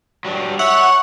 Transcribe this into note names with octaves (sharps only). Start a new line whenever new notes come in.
F#3 G3 D4
C#5 E5 F#5